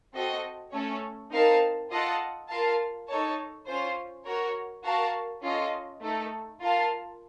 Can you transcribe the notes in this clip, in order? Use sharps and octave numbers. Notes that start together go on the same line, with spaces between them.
C4 F#4 A4 D#5
A3 C#4 A4 C#5
C4 D#4 A#4 F5 A5
F4 A4 D#5 F#5 A5
F4 A#4 F5 A5
D#4 A4 C#5 A5
C#4 F4 C5
F#4 A#4 C#5
F#4 A#4 F5 A5
C#4 F4 A4 D#5
A3 D#4 A4
F4 A#4 F5 A5